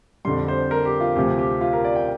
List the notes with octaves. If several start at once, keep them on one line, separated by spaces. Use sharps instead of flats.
F2 D3 G3 C6
C5
A#4
G4
F4
D2 C3 F3 G4
G4
F4
A#4
D5
G5